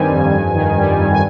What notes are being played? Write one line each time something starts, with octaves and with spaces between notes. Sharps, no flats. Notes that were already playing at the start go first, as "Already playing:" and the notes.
Already playing: G2 D#3 G3 C4 G#5
F2
G2
D#3
G3
G2
G#5